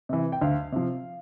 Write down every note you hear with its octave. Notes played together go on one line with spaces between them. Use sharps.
C3 E3
G5
D2 F5
C3 F3